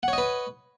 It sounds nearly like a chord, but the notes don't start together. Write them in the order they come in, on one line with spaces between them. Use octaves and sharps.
F#5 C#5 D#5 B4